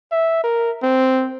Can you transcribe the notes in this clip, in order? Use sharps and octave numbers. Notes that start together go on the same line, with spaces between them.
E5
A#4
C4